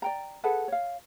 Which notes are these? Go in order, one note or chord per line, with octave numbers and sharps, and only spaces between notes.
D5 G5 A#5
G#4 A4 B4 F#5
C#5 F5